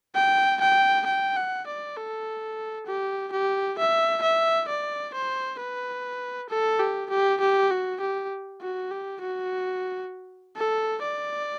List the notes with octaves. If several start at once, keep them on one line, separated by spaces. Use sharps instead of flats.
G5
G5
G5
F#5
D5
A4
G4
G4
E5
E5
D5
C5
B4
A4
G4
G4
G4
F#4
G4
F#4
G4
F#4
A4
D5